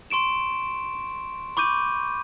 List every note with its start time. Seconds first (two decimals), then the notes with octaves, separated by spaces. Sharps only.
0.10 C6 C#6 D7 E7
1.57 B5 C#6 D6 G6 D#7